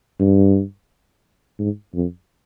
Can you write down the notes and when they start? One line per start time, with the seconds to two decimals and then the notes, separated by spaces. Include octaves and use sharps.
0.20 G2
1.59 G#2
1.94 F2